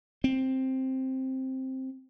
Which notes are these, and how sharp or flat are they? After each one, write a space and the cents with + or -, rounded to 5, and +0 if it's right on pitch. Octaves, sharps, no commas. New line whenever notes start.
C4 +5